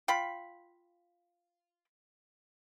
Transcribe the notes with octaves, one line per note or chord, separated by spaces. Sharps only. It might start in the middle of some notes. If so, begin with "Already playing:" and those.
F4 G5 B5